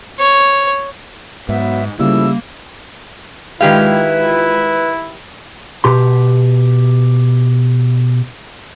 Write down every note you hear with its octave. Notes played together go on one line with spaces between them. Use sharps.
C#5
G#2 F#3 B3 E5
C#3 F3 G3 A3 A#3 E4 E6
D#3 G#3 E4 F4 G4 B4 F5 G#6
B2 G4 C6